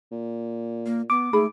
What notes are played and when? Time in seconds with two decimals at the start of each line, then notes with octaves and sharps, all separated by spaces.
0.12 A#2
0.86 A#3
1.10 B3 D6
1.33 G#2 A3 G#4 B5